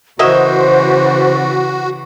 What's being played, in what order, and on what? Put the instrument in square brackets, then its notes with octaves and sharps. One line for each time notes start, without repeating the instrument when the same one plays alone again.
[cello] C#3 E3 [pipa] A#3 D#5 E5 [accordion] F#4 [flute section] C5